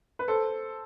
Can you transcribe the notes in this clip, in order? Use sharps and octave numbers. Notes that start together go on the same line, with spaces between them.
B4
A4 C5